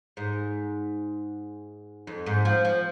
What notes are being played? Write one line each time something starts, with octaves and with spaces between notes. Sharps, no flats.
G#2
F2
G#2
F3
F3